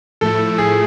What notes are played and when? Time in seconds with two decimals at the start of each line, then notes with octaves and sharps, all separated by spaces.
0.21 A2 F3 A3 E4 A4
0.58 G#4